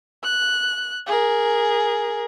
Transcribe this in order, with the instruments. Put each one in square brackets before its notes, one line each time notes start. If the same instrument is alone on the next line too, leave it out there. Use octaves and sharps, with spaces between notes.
[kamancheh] F#6
G#4 A#4